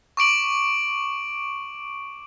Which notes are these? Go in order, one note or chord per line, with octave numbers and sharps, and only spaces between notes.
C#6 D6 D7 F#7